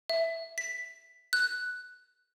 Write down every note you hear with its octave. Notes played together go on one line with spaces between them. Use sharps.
E5
B6
F#6